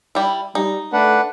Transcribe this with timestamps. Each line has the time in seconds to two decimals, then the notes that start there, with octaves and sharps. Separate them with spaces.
0.15 G3 E4
0.55 G3 D#4
0.93 A3 D4 B4 F#5